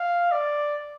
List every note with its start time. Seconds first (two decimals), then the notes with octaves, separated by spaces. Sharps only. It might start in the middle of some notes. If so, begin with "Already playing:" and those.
Already playing: F5
0.32 D5